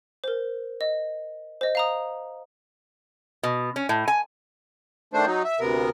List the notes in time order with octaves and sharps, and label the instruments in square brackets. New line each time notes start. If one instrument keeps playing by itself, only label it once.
[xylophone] A#4 C5
D#5
C5 D#5
F5 A#5 D#6
[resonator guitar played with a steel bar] B2
C#4
A2
G#5
[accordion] D#3 A3 D4 C5
F#3 D#4
E5
D2 C3 B3 A#4